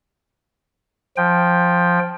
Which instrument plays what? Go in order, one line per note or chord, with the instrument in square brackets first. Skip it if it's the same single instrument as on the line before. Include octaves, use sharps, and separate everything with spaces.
[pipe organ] F3 G5